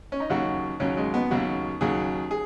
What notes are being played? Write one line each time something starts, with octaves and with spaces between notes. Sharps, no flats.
C#4
D#4
D#2 C#3 F#3 F#4
D#2 C#3 F#3 C#4
G#3
B3
D#2 C#3 F#3 F#4
D#2 C#3 F#3 G#4
G#4